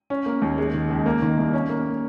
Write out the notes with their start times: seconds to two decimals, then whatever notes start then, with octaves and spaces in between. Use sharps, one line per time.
0.10 C#4
0.26 A#3
0.42 D#2
0.58 G#3
0.74 D#3
0.90 C#2
1.06 A#3
1.22 D#3
1.37 C2
1.53 C#4
1.70 A#3